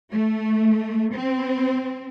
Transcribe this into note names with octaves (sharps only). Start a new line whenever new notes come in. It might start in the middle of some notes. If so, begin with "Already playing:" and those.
A3
C4